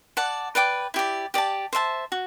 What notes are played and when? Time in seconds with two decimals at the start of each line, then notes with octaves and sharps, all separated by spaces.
0.17 D5 F#5 A5
0.55 B4 D5 G5 D6
0.94 E4 G4 D5
1.34 G4 D5 A5
1.73 C5 E5 A5
2.12 F#4